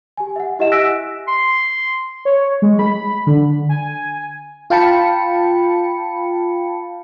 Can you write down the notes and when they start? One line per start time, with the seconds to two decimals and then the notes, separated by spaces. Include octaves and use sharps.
0.17 G4 G#5
0.36 E5 F#5
0.59 E4 G4 D#5 E5 F#5 E7
0.71 G#5 E6 F#6 A#6 B6 D7
1.28 C6
2.25 C#5
2.62 G#3
2.79 B5
3.27 D3
3.69 G#5
4.70 F4 F5 G5 A5 B5 C#7